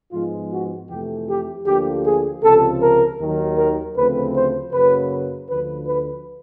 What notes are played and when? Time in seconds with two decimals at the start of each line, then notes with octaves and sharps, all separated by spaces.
0.12 G#2 F3 G#3 B3 F4
0.52 F#4
0.90 F2 C3 E3 A3 G4
1.28 G4
1.66 D2 D3 F3 A#3 G4
2.05 G#4
2.43 C#2 C3 F3 A4
2.82 A#4
3.19 D#2 D#3 F#3
3.57 A#4
3.96 D2 C#3 F3 A3 C4 B4
4.35 C5
4.73 F#2 C#3 F#3 A#3 B4
5.49 D2 D3 F3 B4
5.88 B4